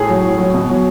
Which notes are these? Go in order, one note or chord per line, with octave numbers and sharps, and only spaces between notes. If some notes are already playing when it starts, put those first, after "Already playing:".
Already playing: A2 G#4
F#3
A2
F#3
B2
F#3